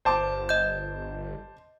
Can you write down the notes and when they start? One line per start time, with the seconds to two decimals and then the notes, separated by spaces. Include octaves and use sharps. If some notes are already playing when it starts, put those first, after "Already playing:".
0.05 G1 C5 A5 D6
0.49 D#5 G6